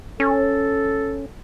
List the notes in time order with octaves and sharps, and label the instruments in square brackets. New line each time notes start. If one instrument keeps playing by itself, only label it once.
[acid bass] C#4 [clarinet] A4